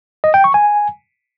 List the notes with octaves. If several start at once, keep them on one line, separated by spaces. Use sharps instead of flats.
D#5
G5
C#6
G#5